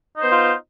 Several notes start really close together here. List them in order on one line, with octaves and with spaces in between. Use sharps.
D#4 C5 B3 F4